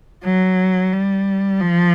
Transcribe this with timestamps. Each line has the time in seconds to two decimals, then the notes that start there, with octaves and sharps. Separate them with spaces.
0.24 F#3
0.92 G3
1.61 F3